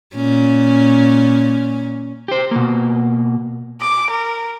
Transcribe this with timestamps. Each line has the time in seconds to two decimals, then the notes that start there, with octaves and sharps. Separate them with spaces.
0.16 A#2 C#4
2.28 G4 C5
2.51 B2 A#3
3.81 D6
4.10 A#4